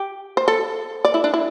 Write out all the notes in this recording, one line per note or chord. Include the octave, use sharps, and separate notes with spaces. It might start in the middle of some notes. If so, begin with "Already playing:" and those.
Already playing: G4
C5
A4
D5
E4
D4
E4